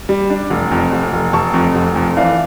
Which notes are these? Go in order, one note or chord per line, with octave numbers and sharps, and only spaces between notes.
G3
D4
F1
F2
F1
F1
F1 A5 C#6
F2
F1
F2
E3 D5 F5